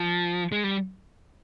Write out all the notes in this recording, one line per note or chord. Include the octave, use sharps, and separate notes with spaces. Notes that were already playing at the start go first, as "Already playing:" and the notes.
Already playing: F3
G#3
G3